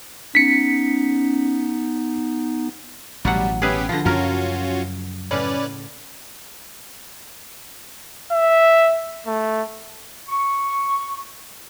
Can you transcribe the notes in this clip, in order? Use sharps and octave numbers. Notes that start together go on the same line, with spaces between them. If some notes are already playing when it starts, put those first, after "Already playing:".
B3 C#4 D#4 B6 C#7
A1 B2 F#3 G3 F#5
B3 C#4 G4 G#4 B4 E5
D3 F3 F4 A#6
F#2 C#3 F#3 C#4 F4 F#4 A#4
A2 C#3 C#4 B4 D5
E5
A3
C#6